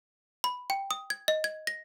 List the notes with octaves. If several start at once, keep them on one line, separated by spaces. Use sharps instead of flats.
B5
G5
D#6
G#6
D#5
G#6
A#6